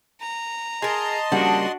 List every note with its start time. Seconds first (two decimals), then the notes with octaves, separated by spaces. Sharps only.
0.21 A#5
0.82 G#4 A#4 D#5 A5 C6
1.32 C#3 F3 G3 A#3 D4 F#4 F#5